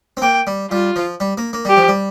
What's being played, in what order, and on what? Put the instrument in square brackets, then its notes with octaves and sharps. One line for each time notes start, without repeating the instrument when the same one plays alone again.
[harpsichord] C4
[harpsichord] A#3 [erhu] G5
[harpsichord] G3
[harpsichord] G3 [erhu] F4
[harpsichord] F3
G3
A#3
A#3
[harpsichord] G3 [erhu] G4
[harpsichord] F3
G3